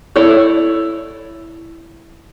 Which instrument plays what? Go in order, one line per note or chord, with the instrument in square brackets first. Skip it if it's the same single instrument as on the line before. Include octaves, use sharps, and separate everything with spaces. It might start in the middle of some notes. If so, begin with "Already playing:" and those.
[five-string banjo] E4 A4 C#5 D5